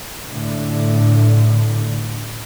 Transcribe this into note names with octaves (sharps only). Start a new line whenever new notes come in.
A2 D3